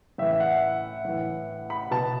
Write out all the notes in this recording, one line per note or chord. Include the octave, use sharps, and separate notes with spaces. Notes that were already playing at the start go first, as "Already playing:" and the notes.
A2 E3 E5
E5
F#5
A2 E3
B5
B2 A5